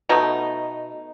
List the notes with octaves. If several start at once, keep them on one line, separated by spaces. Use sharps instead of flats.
B2 A3 B3 D#4